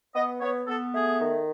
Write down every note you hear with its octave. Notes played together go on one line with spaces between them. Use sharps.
B3 D#5
B3 C#5
B3 A4
A3 G#4
D#3